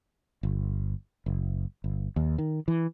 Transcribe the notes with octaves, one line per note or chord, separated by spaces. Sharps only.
G1
F#1
G1
D#2
D#3
E3